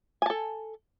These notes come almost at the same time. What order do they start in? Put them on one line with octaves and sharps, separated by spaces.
G#5 A5 A4